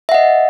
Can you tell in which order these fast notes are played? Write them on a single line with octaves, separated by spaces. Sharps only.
E5 F#5 D#5